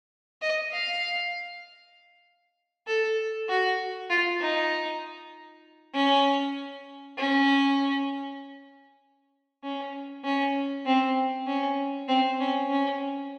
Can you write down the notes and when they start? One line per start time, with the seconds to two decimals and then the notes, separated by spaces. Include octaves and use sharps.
0.42 D#5
0.72 F5
2.87 A4
3.49 F#4
4.10 F4
4.41 D#4
5.94 C#4
7.18 C#4
9.63 C#4
10.24 C#4
10.86 C4
11.47 C#4
12.08 C4
12.40 C#4
12.70 C#4